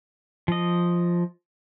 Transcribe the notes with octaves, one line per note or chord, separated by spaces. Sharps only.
F3 D#5